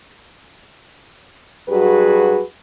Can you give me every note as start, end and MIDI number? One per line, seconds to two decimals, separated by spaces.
1.69 2.40 43
1.69 2.40 54
1.69 2.40 66
1.69 2.40 68
1.69 2.40 71